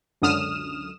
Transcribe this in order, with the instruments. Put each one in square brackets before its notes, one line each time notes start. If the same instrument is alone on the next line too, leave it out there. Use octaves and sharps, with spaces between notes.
[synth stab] C#2 F#2 D3 D#6 F6 E7